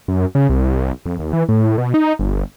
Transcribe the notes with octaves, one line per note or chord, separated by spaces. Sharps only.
F#2
C#3
C2
F2
D#2
E3
A2
B2
D#4
G1